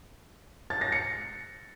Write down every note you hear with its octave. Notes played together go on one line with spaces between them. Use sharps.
A6
A#6
C#7